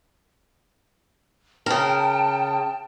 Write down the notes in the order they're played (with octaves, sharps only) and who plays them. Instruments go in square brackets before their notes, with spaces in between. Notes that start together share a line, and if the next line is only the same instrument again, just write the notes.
[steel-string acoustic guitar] C#3 A#4 [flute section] G5 A5